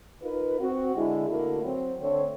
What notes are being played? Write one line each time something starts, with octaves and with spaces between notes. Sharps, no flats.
D#4 F4 A#4 B4
C4 F#4
D3 G#3 E4
D3 A3 A#3 E4 F#4
F#3 C4
D3 A3 C4 C#5